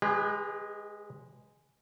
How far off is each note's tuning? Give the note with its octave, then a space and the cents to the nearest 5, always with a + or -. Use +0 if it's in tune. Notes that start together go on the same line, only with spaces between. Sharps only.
G#3 +0 G4 +45 B4 +0